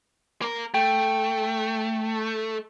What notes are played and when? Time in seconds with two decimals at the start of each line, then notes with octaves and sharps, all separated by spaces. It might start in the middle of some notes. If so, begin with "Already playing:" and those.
0.42 A#3 A#4
0.74 A3 G5